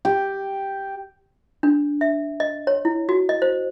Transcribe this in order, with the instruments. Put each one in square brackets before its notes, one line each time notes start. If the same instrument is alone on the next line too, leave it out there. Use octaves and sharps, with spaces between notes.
[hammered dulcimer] G4
[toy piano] D4
E5
D#5
C#5
E4
F#4
D#5
C5